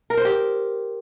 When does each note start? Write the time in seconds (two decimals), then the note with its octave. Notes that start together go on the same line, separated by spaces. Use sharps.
0.10 A#4
0.17 C5
0.25 G4